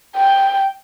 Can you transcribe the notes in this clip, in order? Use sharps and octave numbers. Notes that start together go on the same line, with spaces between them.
G5